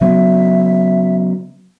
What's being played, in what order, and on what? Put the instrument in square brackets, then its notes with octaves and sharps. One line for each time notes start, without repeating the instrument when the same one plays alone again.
[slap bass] C#3 F#3 B3 [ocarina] E5